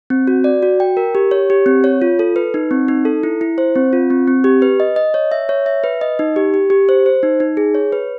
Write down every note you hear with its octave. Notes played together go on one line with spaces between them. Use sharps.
C4
F#4
D5
F#4
G5
A#4
G4
C#5
G4
C4
C#5
F4
A4
B4
D#4
C4
D#4
A4
E4
E4
C5
C4
F4
C4
C4
G4
B4
D#5
D#5
C#5
E5
C#5
E5
B4
D#5
D#4
G4
G4
G4
C5
C5
D#4
D#4
G#4
C#5
B4